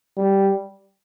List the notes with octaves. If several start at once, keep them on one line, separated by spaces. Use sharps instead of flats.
G3